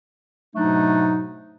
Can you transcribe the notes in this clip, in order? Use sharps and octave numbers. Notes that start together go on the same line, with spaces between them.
G#2 B2 F#3 A3 D4 D#4